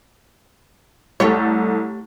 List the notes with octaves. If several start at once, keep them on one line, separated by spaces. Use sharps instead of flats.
C2 A3 G4 A4 C#5